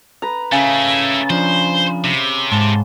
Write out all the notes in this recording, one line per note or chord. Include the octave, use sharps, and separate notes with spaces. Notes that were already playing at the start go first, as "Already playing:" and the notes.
B4 A#5
C#3 A3 E4
F3 D4 C5
C3
G#2 A5 C6